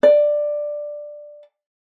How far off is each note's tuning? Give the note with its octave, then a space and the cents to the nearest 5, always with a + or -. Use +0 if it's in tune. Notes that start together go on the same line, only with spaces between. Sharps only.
D5 +10